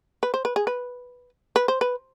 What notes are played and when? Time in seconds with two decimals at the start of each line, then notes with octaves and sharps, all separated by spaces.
0.23 B4
0.34 C5
0.45 B4
0.56 G#4
0.67 B4
1.56 B4
1.68 C5
1.81 B4